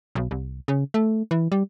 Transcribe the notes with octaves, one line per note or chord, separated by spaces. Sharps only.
B1
C2
C#3
A3
E3
G3